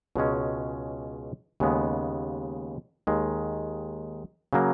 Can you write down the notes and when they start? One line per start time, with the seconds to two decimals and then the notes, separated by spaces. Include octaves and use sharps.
0.16 C#2 B2 G#3 C#4
1.60 D#2 C#3 G#3 B3
3.07 D#2 D#3 G#3
4.53 C#3 F#3 A#3